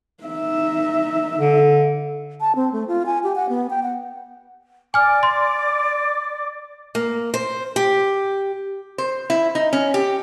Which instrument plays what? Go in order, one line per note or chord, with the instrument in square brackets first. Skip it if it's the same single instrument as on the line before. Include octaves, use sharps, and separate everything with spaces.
[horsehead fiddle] D#4 E5
[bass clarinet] D3
[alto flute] A5
C4
A3
F4
G#5
G4
F#5
B3
G5
F#5
[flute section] D5 D6 [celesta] G#5 F6
[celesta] C6
[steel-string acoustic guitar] A#3
C5
G4
[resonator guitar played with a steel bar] C5
E4
D#4
C#4
G4